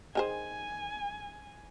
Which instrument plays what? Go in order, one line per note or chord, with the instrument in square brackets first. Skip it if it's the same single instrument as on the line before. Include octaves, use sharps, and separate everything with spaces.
[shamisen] D#3 G#4 C5 [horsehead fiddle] G#5